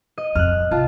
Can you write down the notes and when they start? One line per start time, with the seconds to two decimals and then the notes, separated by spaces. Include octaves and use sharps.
0.18 D#5
0.35 D#1 F2 F6 F#6
0.71 C2 F4 A5